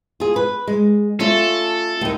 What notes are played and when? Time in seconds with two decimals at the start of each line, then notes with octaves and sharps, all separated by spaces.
0.20 F4 G#4
0.36 B4
0.67 G#3
1.20 A3 C#4 F4 A4
2.01 D#2 D#3